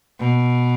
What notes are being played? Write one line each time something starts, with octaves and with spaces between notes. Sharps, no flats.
B2